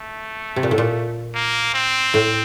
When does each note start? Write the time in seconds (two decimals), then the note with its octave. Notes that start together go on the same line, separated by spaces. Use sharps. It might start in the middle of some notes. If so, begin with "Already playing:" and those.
Already playing: A3
0.56 C3
0.63 A#2
0.71 A2
0.78 A#2
1.35 A#3
1.74 C4
2.14 A2